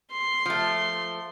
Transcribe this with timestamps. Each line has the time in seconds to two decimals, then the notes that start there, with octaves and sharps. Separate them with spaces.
0.12 C6
0.46 F3 A3